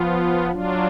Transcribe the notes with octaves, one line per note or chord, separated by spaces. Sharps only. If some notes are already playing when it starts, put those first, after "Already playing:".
Already playing: F3 B3 F4
F#3 D4 F4